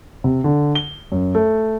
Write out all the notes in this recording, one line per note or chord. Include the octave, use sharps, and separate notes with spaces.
C3
D3
G7
F#2
A3